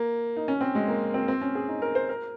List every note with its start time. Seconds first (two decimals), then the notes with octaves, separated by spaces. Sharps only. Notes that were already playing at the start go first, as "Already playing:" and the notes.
Already playing: A#3
0.36 D#4
0.48 C#4
0.61 C4
0.75 G#3
0.88 A#3
1.14 C4
1.28 C4
1.41 C#4
1.55 G#4
1.68 D#4
1.82 A#4
1.95 C5
2.09 A#4